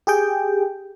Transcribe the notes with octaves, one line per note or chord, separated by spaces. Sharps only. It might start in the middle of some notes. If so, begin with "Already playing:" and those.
G4 G#4 G5